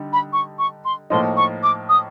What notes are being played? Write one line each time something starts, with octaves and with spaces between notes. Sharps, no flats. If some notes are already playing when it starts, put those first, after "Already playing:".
Already playing: D3 G3 D#4
B5
C#6
C#6
C6
A2 F3 A#3 D#4 C6
C#6
D6
D#6